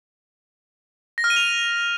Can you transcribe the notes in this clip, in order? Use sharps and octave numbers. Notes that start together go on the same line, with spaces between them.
A#6
F6
D#7
F7